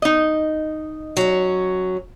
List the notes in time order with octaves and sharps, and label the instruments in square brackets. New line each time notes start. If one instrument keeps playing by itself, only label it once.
[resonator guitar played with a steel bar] D#4 D#5
[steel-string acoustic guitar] F#3 C#4